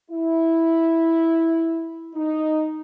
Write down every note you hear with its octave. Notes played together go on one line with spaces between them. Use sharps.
E4
D#4